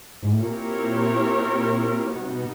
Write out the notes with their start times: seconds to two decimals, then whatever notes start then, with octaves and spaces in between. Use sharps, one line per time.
0.23 G#2
0.31 A2
0.39 A#2 C4 E4 G4 A#4 C#5
2.13 B2 G3 B3 D#4 F#4
2.21 C3
2.29 B2